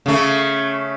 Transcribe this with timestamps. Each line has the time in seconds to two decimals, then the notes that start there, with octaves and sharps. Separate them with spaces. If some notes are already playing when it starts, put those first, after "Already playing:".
0.06 C#3 A3